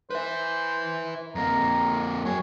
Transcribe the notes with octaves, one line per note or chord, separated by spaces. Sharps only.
B4 C5 E5
F2 A#3 A#5
F#3 G#4 C#5